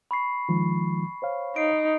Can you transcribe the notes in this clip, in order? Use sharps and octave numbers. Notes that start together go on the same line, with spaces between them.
B5 C#6 C7
D#3 F3 G#3
C5 C#5 F5
D#4 C7 D7